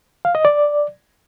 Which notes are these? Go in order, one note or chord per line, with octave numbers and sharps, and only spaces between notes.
F5
D#5
D5